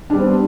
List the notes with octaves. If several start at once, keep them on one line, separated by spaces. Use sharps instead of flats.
G3 B3 C4 D4